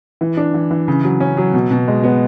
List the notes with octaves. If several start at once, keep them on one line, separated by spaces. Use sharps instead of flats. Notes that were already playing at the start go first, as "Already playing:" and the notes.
E3
D4
E3
E3
C#3
F#3
C#4
F#3
B2
B2
G#3
B3